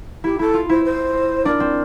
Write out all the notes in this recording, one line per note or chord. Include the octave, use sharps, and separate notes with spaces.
E4 G4
E4 A4
F4
E4 C5
C5
D4 A#4
C4